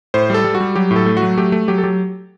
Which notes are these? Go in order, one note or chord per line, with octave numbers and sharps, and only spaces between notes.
A2 C5
G3 A4
G3
F#4
G3
F#3 G4
A2
A4
A3
F#4
F#3
A3 G4
A3
F#3 G4
A4
F#3 G4